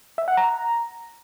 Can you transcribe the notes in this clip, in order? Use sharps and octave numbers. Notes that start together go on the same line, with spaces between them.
E5
F#5
A#5